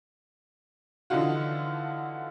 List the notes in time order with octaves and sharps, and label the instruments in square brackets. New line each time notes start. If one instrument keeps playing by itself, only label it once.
[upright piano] D3 E3 F3 D#4 F4 F#4